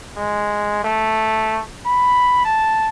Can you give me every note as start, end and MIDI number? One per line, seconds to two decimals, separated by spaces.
0.17 0.82 56
0.84 1.62 57
1.86 2.44 83
2.45 2.89 81